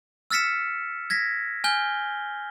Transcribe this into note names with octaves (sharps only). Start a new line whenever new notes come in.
E6 F6 A6 B6 C#7 E7
G#6 A#6 B6
G#5 F6 G6 G7